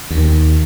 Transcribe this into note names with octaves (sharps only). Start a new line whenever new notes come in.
D#2